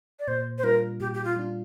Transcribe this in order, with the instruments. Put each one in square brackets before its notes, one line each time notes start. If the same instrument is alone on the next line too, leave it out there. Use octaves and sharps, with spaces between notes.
[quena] D5
[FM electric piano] A#2 [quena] C5
[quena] C5
[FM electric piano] G3 D4 F4 [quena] A#4
[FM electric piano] A#2 [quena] G4
[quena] G4
F4
[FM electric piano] G3 D4 F4